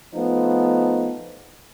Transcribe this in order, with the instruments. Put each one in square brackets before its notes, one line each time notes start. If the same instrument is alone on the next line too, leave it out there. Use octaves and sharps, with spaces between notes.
[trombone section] F3 A3 B3 D#4